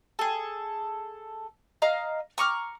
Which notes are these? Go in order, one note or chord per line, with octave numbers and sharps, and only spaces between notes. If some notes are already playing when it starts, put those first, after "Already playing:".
G#4 A4
D#5 F5 A#5 F6
A#5 C#6 D6 F6